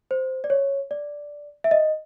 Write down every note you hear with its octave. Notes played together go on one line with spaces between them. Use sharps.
C5
D5
C#5
D5
E5
D#5